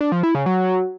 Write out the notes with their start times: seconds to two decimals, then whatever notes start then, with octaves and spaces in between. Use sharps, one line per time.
0.01 D4
0.12 F3
0.23 E4
0.35 C#3
0.46 F#3